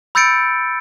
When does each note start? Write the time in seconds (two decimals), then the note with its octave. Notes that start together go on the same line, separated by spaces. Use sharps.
0.15 B5 E6 G6 A6 C#7 D7